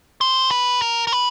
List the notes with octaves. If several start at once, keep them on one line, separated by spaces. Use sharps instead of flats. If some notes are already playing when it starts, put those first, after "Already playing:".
C5
B4
A#4
A#4
B4